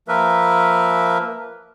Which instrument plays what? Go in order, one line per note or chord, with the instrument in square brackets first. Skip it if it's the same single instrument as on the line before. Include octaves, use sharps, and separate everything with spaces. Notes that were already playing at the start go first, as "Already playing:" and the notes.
[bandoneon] F3 A#3 A#4 B4 E5